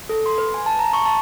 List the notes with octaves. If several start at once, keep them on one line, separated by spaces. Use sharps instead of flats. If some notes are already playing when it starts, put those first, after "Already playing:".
A4
C6
B4
G#5
A5
A#5
C#6
A5